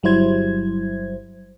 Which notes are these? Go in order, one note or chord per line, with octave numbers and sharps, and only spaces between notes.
G1 F#3 G3 E4 C5 G#6